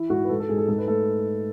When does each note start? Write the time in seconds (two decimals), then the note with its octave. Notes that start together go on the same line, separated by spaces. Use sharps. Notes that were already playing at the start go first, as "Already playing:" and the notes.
Already playing: E3 E4
0.10 G#2 F#4
0.24 B4
0.29 G#2 A4
0.40 A4
0.49 G#2 G#4
0.58 A4
0.68 G#2 A4
0.78 B4
0.87 A3 A4